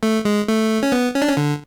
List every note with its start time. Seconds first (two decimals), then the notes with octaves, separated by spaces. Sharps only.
0.03 A3
0.25 G#3
0.48 A3
0.83 C#4
0.92 B3
1.14 C#4
1.22 D4
1.28 C#4
1.37 D3